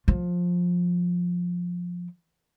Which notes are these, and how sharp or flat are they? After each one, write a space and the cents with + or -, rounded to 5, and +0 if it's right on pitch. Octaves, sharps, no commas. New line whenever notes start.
F3 +15